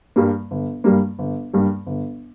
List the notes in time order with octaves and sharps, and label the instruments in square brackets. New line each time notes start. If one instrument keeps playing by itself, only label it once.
[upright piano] G2 G3 A#3
G1
G2 G3 A#3
G1
G2 G3 A#3
G1